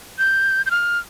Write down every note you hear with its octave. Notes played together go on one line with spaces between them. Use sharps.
G6
G6
F6